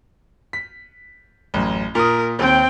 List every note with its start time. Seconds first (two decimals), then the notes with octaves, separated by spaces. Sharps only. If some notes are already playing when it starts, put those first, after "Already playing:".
0.53 B6
1.54 A1 F#2
1.95 A#2 A#4 D#6
2.39 D#2 C4 G5